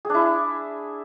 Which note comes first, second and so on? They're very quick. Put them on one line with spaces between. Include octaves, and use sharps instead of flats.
G#4 D4 E4